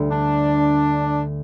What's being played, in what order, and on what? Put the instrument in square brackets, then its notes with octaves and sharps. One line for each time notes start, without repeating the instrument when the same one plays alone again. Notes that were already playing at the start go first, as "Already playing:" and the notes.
Already playing: [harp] D2 D3 G3
[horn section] D4